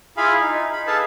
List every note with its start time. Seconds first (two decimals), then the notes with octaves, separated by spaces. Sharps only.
0.17 E4 F4 G#4 F5 G#5 B5
0.41 D#4
0.73 B5
0.87 G#4 A4 B4 F5 A5